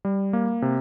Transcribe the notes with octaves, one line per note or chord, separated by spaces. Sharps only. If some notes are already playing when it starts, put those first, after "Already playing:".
G3
A#3
C3